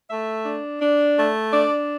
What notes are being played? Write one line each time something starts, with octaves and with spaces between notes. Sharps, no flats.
A3 E5
D4
D4
A3
D4 D5